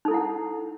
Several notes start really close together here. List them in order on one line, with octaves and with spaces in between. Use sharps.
D#4 A4 E4 F#5